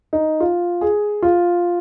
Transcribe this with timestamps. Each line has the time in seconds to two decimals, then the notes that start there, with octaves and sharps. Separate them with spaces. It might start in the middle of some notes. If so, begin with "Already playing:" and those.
0.13 D#4
0.40 F4
0.81 G#4
1.22 F4